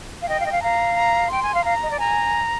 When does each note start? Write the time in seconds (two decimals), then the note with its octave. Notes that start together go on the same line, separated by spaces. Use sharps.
0.22 F5
0.29 D#5 G5
0.40 F5
0.46 D#5
0.52 F5
0.63 F5 A#5
0.97 A#5
1.31 G5 C6
1.43 G#5
1.54 F5
1.65 F5 A#5
1.83 D#5
1.91 D5
2.00 G#5 A#5